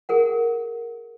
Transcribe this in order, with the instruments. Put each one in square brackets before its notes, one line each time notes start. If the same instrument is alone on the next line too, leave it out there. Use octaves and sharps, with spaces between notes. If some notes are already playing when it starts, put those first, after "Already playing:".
[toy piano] G#4 A#4 F#5